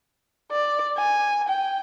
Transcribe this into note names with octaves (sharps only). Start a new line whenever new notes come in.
D5
G#5
G5